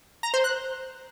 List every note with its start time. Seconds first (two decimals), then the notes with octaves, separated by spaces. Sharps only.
0.23 A#5
0.34 C5
0.44 F#6